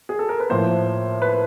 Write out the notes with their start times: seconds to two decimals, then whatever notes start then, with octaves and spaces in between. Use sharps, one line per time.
0.09 G#4
0.19 A4
0.29 A#4
0.40 B4
0.49 A2 F3 A#3 C5
1.22 B4